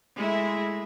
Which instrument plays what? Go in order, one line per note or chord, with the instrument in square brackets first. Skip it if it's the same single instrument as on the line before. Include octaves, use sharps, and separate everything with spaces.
[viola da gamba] G#3 A3 E4